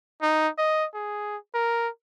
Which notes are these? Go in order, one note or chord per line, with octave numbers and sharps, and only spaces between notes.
D#4
D#5
G#4
A#4